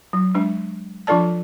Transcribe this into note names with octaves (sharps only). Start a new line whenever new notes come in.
F#3
G#3 D4
F3 D4 F4 A4 D5 A5